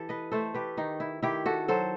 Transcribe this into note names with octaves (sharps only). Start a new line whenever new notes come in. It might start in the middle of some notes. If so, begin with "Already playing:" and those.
Already playing: E3 G4 A4
B4 D#5
A3 A4 C5
G4 B4
D#3 D#4
E4
D#3 E4 G4
F#4 A4
F#3 A4 C5